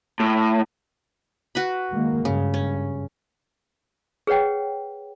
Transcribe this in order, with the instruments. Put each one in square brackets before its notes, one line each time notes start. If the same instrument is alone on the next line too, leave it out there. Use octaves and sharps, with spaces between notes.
[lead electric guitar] A2
[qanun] F#4 B4 B5
[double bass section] D#3 G#3 A#3
[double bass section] G2 [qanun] C#3
[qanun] C#4
[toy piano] G#4 B4 C#5 F#5 G5